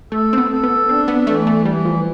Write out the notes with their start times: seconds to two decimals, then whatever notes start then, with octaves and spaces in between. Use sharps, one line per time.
0.12 A3 A4
0.33 C4
0.38 B3
0.51 A4
0.64 B3
0.88 C4 D4
1.08 B3
1.27 E3 A3
1.47 A3
1.65 E3 G3
1.85 F3